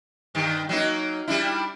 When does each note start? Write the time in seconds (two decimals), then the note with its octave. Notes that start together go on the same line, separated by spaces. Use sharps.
0.35 G2 D#3
0.69 F#3 A#3 D#4
1.28 G3 D4 E4